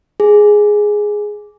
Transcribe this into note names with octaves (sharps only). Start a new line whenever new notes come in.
G#4